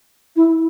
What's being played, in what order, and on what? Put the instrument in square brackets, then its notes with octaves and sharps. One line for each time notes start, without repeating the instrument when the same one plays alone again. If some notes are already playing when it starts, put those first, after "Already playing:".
[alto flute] E4